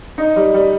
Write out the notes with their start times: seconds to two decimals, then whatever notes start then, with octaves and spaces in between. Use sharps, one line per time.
0.18 D#4
0.36 G3
0.54 G3